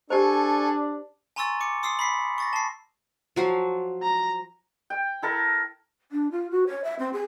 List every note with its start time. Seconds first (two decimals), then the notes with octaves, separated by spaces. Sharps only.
0.10 D4 G4 A4 C5 G#5 C#6
1.36 G#5 A#5 C6 C#6 E6 A6
1.61 D6 C#7
1.83 C6 D#6 E6 C7
1.99 B5 B6 C7
2.38 C#6 A6 A#6
2.53 A5 C7
3.36 F3 F#3 F5
4.02 A#5
4.90 G5
5.22 E4 A4 A#4
6.12 D4
6.31 F4
6.51 F#4
6.67 C#5
6.84 E5
6.99 C4
7.13 G#4